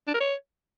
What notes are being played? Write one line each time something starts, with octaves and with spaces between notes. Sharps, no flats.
D4
A#4
C#5